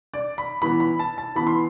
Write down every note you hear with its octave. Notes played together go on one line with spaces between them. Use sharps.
D5
B5
E3 B3 B5
B5
A5
A5
E3 B3 B5
C6